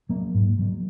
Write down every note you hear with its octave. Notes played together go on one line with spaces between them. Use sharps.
F#3 A#3
G#2
F#3 A#3